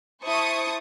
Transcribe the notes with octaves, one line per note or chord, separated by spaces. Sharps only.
E4 C5 A5 C#6 D#6